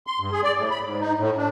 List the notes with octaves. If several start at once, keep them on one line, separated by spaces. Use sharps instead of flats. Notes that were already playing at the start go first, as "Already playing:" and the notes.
C6
G2
G#4
D5
A2
B5
G#2
D#4
A2
D4